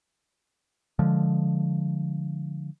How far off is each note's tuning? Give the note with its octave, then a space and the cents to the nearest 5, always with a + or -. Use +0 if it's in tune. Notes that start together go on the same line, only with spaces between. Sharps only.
D3 +0 F3 +0 G#3 +0